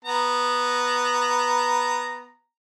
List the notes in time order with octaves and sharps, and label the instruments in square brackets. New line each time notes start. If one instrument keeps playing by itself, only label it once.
[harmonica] B3 A#5